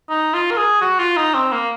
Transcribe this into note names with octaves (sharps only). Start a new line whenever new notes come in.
D#4
F4
A#4
G#4
F#4
F4
D#4
C4
A#3